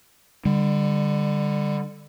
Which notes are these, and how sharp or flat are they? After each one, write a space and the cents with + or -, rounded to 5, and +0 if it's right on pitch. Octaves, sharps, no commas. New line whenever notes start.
D3 +10 G3 +30